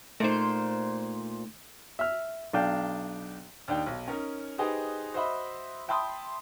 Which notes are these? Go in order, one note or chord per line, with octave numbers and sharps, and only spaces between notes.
A#2 A3 D#4 C5
E5 F6
B1 D4 F5 G5
D#2 D4 D#4 G5
B1
C#4 D#4 A#4
D#4 G4 G#4 B4 C5 D#5
F#4 C5 D#5 E5 B5
E5 G5 A5 B5 C6 D#6